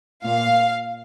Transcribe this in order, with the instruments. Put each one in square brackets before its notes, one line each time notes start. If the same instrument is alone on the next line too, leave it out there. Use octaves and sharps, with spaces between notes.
[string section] A#2 F5